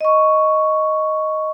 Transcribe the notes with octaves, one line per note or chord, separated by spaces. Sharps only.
D#5 C#6